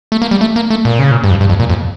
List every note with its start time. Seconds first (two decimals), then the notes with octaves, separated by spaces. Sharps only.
0.12 A3
0.22 A#3
0.31 G3
0.41 A3
0.56 A#3
0.70 A3
0.85 A#2
0.99 C#3
1.11 A#2
1.24 G2
1.31 F2
1.41 G2
1.49 F2
1.60 A#2
1.69 F2